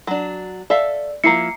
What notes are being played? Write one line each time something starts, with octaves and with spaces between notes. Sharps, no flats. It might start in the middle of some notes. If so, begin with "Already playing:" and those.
F#3 D4
A4 D5 E5 F5
F3 A#3 E4 A#5 C7 C#7